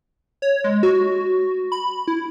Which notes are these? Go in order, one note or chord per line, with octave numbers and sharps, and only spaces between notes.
C#5
G#3
F#4
B5
E4